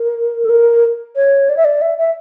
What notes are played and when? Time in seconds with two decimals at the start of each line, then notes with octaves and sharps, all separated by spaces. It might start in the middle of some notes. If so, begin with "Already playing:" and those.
Already playing: A#4
0.45 A4
0.49 A#4
1.16 C#5
1.49 D5
1.57 E5
1.65 D5
1.81 E5
1.98 E5